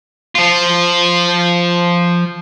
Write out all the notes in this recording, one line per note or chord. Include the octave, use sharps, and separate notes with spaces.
F3 F4